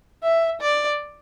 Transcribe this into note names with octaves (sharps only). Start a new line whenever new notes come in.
E5
D5